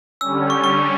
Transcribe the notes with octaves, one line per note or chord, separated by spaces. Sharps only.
D3 G3 C#4 E6
C#6
C#6